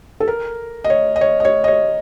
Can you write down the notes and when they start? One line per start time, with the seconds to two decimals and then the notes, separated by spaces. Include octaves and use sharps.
0.20 A4
0.28 A#4
0.84 D#5
0.90 C#5
1.16 D#5
1.21 C#5
1.40 D#5
1.45 C#5
1.64 D#5
1.68 C#5